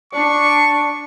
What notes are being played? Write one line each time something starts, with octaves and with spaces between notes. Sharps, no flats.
D4 C#6